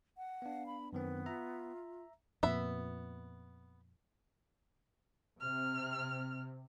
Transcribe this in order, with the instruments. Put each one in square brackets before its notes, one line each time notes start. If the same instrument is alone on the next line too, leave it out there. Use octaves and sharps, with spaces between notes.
[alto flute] F#5
[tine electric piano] B3 D4 [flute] F5
[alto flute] B5
[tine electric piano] F#2 D#3 C4 [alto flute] B3 [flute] B4
[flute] F4 [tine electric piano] E5 A#5
[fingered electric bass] F2 A#2 [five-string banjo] B3 E5 B5
[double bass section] C3 [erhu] F6